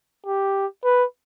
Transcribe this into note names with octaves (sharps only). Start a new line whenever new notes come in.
G4
B4